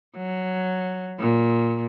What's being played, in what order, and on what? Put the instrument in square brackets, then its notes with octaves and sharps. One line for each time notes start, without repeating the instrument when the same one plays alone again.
[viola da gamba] F#3
A#2